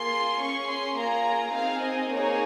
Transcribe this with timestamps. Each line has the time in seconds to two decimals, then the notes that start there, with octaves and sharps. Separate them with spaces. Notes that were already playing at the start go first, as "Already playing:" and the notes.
Already playing: A#3 F4 G#4 C6
0.41 C#4 G#4 C#6
0.69 C6
0.98 A#3 F4 G#4 A#5
1.54 C4 D#4 G#4 F5
1.82 D#5
2.11 A#3 D#4 G#4 C#5